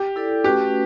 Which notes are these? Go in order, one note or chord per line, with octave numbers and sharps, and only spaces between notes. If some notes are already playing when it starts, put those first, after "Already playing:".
Already playing: G4
E4 A4 D5
A3 C#4 F#4 G4 B4